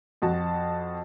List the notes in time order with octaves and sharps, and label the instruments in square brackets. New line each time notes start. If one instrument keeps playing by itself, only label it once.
[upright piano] F2 F#4 A5